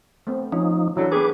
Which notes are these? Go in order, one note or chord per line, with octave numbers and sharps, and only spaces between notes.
A3 B3 C4
F3 C#4 D#4
E3 F#3 D4 E4 A4
B3 G4 G#4 B4 C#5 D6